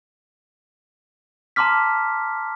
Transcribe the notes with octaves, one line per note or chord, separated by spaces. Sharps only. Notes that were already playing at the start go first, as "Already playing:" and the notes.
A5 A#5 C6 D6 F6 B6